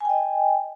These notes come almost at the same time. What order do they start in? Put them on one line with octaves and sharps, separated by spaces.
G#5 G5 D#5